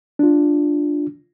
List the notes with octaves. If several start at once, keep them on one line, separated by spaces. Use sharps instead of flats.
D4 F4